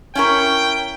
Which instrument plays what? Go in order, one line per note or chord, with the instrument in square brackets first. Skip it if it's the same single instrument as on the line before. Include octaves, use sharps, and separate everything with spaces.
[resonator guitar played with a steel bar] C#4 E4 A#4 [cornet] G5